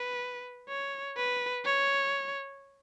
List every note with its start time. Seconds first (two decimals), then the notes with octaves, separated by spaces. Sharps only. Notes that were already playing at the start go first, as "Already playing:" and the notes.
Already playing: B4
0.69 C#5
1.16 B4
1.65 C#5